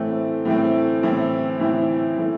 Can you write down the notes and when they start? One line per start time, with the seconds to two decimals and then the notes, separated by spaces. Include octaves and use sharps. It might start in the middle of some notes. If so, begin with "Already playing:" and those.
Already playing: A2 E3 A3 C4
0.45 A2 E3 A3 C4
1.03 A2 E3 C4 E4
1.60 A2 E3 C4 E4
2.18 E3 A3